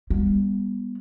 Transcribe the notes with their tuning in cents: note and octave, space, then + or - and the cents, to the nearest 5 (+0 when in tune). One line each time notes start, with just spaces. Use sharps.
G3 +30 B3 -15